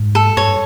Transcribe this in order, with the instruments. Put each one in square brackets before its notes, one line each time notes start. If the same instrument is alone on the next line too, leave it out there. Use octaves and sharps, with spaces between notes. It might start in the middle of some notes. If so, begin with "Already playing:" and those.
Already playing: [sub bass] G#2
[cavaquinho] A4
[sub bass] G2 [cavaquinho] C#5